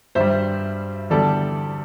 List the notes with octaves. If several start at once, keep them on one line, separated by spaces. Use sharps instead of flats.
G2 G3 C5 E5
E2 D3 G3 A4 D5